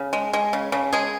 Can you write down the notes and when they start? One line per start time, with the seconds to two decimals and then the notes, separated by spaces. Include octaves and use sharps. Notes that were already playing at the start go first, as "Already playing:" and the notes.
Already playing: C#3
0.13 G#3
0.33 G#3
0.53 C#3
0.72 C#3
0.93 G#3 G#4